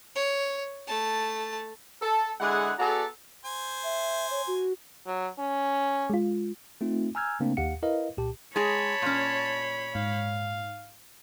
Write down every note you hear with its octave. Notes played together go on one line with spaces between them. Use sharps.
C#5
A3 A5
A4
D3 G#3 E4 G#4 F#5
B3 F#4 G#4 A4 D5 A#5
C5 G#5
E5
C#5
F#4
F#3
C#4
G#3 F4
A3 C4 D#4 F4
G#5 A#5 E6 F6 G6 G#6
C#3 A3 A#3 C4 D4
D#2 G4 F5 F#5 C#7
E4 A#4 B4 D#5 F5
C2 A#2 G4 A5
G#3 G#4 C#5 A5 B5
A#2 C#4
G#2 F5